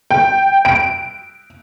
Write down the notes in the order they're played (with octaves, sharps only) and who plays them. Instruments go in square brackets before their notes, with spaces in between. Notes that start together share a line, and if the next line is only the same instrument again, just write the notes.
[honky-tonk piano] G5
D7